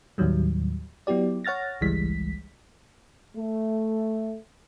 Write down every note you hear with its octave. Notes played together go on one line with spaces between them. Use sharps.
D#2 A2 D#3 F#3 G3
F#3 B3 E4 G4 D5
C#5 F#5 F6 A6 A#6
G#1 C#2 E3 G3 G#3 B6
A3